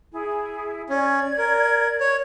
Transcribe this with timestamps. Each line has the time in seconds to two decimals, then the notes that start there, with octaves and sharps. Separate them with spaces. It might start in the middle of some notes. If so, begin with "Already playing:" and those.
0.12 E4 G#4
0.90 C#4 D5 G#6
1.38 A#4
2.00 C#5